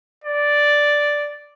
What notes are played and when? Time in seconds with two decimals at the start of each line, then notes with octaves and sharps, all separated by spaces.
0.24 D5